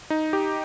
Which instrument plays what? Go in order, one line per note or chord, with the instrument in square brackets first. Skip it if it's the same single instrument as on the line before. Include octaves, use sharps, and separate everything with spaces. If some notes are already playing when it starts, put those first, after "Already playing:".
[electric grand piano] D#4
G4